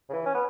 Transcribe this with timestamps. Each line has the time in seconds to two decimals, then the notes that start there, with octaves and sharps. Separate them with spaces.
0.09 C#3
0.13 E3
0.26 C#4
0.34 B3